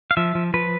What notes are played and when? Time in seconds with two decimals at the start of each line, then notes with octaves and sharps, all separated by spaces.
0.11 F5
0.17 F3 E5
0.35 F3
0.54 F3 B4